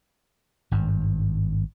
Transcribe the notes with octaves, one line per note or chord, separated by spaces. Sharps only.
G#1 G2